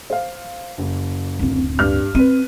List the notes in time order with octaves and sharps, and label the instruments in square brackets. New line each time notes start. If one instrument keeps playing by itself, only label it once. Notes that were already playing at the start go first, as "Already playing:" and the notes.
[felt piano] C5 F5
F#1
[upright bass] D1 C4
[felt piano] G2 G3 F6
[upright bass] C4 [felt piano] B4 D#7